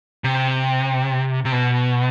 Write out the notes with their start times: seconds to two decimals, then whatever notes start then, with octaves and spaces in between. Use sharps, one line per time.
0.24 C3
1.45 C3
1.52 B2